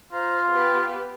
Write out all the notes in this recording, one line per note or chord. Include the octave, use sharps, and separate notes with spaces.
F4 C5 A#5
B3 G4 B4